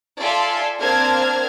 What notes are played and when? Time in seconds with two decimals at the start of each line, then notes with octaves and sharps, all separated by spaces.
0.19 F4 A4 D5 E5 G#5 C6
0.78 A#3 C4 D4 A5 F6 G#6